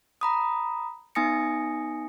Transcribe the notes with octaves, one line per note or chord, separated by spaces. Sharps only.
A#5 B5 D#6
B3 D#4 G#5 D#6 A#6 C#7